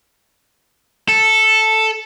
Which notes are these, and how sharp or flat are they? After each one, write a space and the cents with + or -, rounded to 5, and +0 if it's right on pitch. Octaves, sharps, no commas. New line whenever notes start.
A4 +0